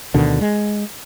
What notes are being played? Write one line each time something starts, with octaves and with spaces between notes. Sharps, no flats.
D2 B2 D3 D#3
G#3